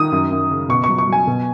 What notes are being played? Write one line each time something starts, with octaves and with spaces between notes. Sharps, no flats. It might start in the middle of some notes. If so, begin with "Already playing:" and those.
Already playing: D#3 D#6
F#2
F#2
C#3
B2 C#6
F#3 C#6
C#6
F#3
G#5
B2